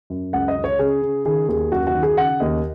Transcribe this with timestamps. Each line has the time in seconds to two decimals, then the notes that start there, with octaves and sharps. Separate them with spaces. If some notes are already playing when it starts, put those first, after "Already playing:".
0.10 F#2
0.33 C#2 F#5
0.48 D#5
0.56 C#3
0.64 C#5
0.79 C#3 G#4
1.02 C#3
1.25 D#3 G#4
1.48 D#2 G#4
1.71 F#2 F#4
1.87 F#4
1.94 D#3
2.03 G#4
2.17 C#3 F#5
2.40 D#2 D#5